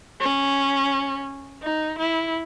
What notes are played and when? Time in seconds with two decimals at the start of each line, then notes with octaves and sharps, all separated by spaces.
0.20 C#4
1.62 D#4
1.98 E4